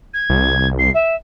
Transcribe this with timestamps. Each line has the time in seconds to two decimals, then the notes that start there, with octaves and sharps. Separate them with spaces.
0.13 G#6
0.30 C2
0.78 C7
0.94 E5